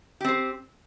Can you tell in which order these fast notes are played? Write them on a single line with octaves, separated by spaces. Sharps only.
G4 C4 C5